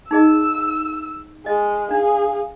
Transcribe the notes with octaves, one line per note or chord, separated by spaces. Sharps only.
D#4 G#4 D#5 E6
G#3 D#5
D4 G#4 F5